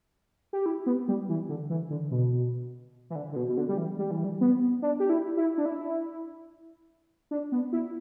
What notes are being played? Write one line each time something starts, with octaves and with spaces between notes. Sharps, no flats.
G4
E4
B3
G3
E3
D3
E3
D3
B2
E3
D3
D3
B2
B2
D3
G3
E3
G3
E3
G3
B3
D4
G4
E4
E4
D4
E4
D4
B3
E4